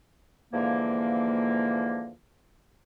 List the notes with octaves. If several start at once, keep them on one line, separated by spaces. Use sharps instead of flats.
G#2 D3 E3 F3 A#3